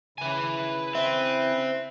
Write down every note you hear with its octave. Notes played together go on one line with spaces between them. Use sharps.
C#3 E4 B4 G#5
C4 E5